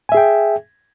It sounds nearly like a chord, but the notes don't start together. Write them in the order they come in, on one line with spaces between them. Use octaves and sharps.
G#5 E5 G#4 G5